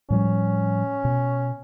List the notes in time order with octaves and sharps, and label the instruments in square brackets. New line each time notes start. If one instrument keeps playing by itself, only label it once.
[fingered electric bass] A2 F3 G3 [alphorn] C#4
[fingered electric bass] B2